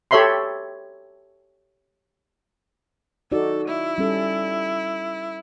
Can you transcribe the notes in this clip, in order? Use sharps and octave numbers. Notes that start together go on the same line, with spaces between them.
G4 A4 C#5 E5 B5 C6
D#4 F#4 A4 D5
E4
G3 C#4 A4